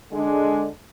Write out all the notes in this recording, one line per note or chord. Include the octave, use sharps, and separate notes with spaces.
D3 G#3 D4